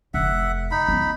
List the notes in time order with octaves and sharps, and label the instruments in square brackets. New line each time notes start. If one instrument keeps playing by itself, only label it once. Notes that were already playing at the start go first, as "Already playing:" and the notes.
[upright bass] F1 [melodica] E5 F#5
[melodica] D#4 B5
[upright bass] B3 C#4